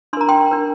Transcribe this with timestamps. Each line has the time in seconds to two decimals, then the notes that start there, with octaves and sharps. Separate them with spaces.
0.13 D4 C6
0.17 A#4 A#5
0.29 G5 C6
0.51 D4 A#4